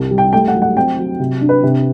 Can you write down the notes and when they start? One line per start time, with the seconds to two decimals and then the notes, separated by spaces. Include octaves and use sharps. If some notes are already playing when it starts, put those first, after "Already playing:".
Already playing: C2
0.11 G3
0.18 G5
0.33 A3 G5
0.48 F#5
0.55 F#3
0.62 F#5
0.76 C4 G5
0.98 F#3
1.20 C3
1.41 D4
1.49 B4
1.63 C3